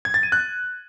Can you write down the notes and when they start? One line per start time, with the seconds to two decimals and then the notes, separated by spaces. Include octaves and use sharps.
0.05 G#6
0.14 A6
0.23 D#7
0.32 F#6